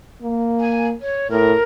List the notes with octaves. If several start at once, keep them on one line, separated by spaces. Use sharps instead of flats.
A#3
G#5
C#5
A2 A#4